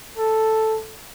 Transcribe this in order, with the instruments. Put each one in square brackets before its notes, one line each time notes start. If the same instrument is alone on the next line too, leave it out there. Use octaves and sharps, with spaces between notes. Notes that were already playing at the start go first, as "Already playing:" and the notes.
[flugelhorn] A4